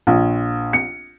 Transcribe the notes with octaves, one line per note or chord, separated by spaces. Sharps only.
A#1
C#7